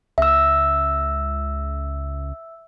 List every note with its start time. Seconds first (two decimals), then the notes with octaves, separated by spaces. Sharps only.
0.18 C#2 E5 E6